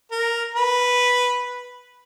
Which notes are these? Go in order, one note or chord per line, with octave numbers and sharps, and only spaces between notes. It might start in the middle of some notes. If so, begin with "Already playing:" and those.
A#4
B4